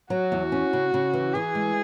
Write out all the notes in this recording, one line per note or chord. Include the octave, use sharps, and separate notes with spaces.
F#3 F#4
E2
C#4
C#3
C#3
E3
E3 G#4
G#3